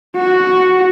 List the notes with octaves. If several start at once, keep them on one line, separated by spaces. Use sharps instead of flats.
F#4